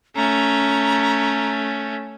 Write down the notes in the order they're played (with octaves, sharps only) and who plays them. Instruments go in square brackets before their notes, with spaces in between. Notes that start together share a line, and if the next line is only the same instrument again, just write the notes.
[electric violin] A3 C#4 [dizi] A#5